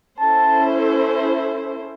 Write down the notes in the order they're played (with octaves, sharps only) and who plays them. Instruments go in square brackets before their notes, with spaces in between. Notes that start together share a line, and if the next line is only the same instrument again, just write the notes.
[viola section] C#4 E4 A4 C5 [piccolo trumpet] A5